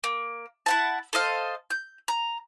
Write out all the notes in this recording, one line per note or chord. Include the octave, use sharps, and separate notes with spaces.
A#3
E4 F#5 A5
A4 C5 D#5 F5
G6
A#5